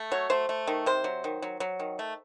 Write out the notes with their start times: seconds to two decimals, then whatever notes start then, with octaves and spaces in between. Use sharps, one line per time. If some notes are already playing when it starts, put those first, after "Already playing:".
Already playing: A3
0.12 F#3 C#5
0.30 A3 C5
0.49 A3
0.67 D#3
0.86 C3 C5
1.04 F#3
1.24 D#3
1.42 F#3
1.60 F#3
1.79 D#3
1.99 A3